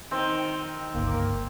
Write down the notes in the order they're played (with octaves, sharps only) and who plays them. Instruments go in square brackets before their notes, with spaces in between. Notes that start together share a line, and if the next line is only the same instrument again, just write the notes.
[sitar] D#3 [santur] C4
[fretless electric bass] G1 C#2 [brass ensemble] A#3